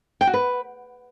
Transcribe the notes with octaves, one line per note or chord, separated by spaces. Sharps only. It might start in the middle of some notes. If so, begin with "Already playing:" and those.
G5
F#4
B4